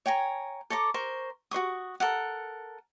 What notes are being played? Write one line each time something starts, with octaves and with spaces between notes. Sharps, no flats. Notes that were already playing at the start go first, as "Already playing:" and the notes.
C#5 G5 G#5 A#5
A4 C#5 A#5 D6
A#4 C5 C#6
F#4 C5 C#6 D#6
A4 A#4 F#5